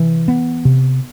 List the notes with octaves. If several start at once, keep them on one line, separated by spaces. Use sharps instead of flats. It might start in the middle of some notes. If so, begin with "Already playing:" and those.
Already playing: C3 E3
B3
C3